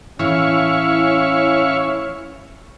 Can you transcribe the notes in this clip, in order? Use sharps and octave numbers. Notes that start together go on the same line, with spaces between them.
A2 E3 C#4 E4 F5 C#6